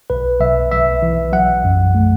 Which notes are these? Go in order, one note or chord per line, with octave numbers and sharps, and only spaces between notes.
B1 B4
B1 E5
B1 E5
E3
F#3 F#5
F#2
A3